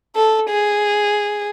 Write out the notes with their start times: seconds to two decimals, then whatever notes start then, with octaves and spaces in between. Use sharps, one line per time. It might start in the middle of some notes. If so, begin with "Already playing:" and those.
0.16 A4
0.50 G#4